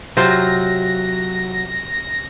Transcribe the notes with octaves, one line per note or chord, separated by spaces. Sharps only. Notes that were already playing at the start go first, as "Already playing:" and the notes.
C3 F#3 F4 C5 A#6